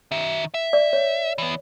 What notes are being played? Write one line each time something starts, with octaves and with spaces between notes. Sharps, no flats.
D#3 E5
E5
D5
C#5
E3 B3